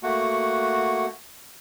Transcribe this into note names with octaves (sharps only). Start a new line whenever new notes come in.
A3 A#3 F#4 F#5